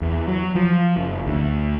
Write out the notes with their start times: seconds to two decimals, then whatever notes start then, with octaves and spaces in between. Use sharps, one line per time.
0.02 E2
0.28 F#3
0.55 F3
0.97 F#1
1.27 D2